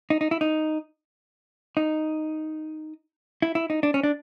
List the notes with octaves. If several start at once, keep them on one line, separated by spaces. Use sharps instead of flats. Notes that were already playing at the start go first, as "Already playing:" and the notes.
D#4
D#4
E4
D#4
D#4
E4
E4
D#4
D4
C#4
D4